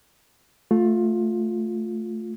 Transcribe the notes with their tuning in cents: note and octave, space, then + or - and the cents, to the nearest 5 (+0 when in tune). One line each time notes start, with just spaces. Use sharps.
A3 +0 F4 +15